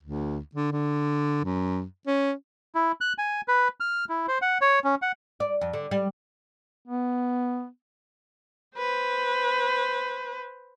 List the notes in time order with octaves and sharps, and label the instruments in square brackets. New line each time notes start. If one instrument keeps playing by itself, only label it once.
[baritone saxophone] D2
D3
D3
F#2
C#4
[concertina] E4
F#6
G#5
B4
F6
E4
C5
F#5
C#5
C#4
F#5
[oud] D5
F2
D3
G3
[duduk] B3
[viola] B4 C5